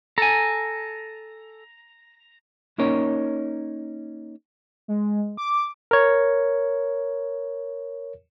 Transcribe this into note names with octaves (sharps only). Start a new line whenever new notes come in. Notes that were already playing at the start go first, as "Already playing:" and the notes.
A4 G#5 A#5
A#3 C#4 D#4 A#4 C#5
G#3
D6
A#4 C#5